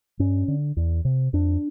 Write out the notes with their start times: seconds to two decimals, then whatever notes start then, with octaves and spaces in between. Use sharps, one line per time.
0.19 G2 C#4
0.48 D3
0.77 E2
1.05 C3
1.33 F2 D4